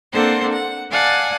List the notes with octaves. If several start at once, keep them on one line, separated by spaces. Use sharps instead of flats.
A#3 C4 D4 A4 C5 F#5
F#5
D5 F5 F#5 G#5 A5